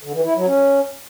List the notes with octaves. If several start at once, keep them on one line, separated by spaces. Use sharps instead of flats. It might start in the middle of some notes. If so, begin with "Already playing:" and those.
D3
E3
E4
F#3
C#4